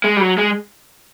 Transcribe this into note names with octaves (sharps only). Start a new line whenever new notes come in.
G#3
G3
F#3
G#3